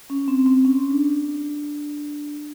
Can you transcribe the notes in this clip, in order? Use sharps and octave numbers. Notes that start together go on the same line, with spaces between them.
C#4
C4
C4
C#4
D4